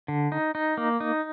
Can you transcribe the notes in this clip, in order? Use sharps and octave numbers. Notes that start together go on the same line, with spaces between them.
D3
D#4
D#4
A#3
D#4